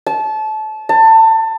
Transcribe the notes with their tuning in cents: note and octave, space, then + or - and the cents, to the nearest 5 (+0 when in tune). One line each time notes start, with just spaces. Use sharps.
A5 -25
A5 +25